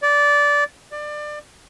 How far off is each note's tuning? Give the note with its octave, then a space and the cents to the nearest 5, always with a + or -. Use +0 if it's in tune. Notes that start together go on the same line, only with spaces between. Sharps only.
D5 -15
D5 +25